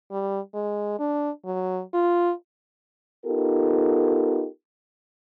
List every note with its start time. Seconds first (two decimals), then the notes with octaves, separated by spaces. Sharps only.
0.12 G3
0.54 G#3
0.99 D4
1.45 F#3
1.94 F4
3.26 B3 D#4 F4 G4 A4 A#4